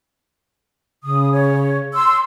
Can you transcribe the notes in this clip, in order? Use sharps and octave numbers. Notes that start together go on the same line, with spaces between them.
C#3 D#6
C#5
C6 E6